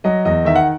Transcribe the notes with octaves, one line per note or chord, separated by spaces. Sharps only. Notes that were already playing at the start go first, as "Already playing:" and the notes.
F#3 D#5
E2 D#5
D#3 E5
F#5